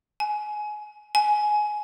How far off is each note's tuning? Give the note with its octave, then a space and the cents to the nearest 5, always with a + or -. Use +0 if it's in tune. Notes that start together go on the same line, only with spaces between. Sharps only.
G#5 +20
G#5 +15